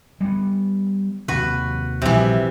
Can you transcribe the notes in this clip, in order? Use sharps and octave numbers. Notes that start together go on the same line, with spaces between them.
G3 A#3 B3
D#2 C3 F#4 B4
A#1 C3 E3 G3